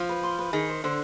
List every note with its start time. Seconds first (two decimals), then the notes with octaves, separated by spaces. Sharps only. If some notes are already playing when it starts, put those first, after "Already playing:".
Already playing: F3
0.09 B4
0.23 C6
0.38 B4
0.53 D#3 G#4
0.69 C5
0.84 D3 C5